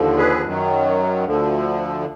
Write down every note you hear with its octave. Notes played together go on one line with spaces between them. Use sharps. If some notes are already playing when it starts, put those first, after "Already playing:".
Already playing: D#2 D3 F3
G#4 B4
F#2 D#3 F#3
D2 D3 F3